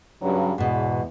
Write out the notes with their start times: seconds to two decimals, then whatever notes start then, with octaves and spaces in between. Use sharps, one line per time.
0.21 G2 C#3 F#3
0.58 E2 G#2 B2